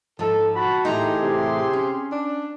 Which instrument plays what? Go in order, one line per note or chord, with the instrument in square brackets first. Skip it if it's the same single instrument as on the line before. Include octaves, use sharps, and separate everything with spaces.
[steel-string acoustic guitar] G#2 F3 [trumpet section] A4
[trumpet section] F#4 A5 B5
[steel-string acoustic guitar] A2 E3 A#5 [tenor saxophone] D#4 [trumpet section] G4 G#4 C6
[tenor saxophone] C3
[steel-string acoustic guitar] C#4
[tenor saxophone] D4